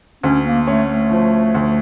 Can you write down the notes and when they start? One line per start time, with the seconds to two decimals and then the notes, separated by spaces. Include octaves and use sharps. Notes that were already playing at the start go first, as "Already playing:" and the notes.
0.23 D2 C#4
0.45 A#3
0.67 A3 C#4
0.89 A3
1.11 F3
1.55 D2